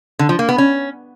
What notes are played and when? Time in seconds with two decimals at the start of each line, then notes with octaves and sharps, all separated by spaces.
0.19 D3
0.29 F3
0.39 A#3
0.49 B3
0.58 C#4